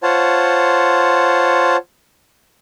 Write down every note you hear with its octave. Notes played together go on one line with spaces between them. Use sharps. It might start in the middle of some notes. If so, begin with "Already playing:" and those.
F4 C5 C#5 F#5 A5